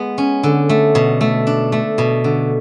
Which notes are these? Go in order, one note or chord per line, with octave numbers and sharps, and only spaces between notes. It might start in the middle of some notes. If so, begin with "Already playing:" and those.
Already playing: G#3 B3
C#4
D3
A3
B2
A3
D4
A3
B2
D3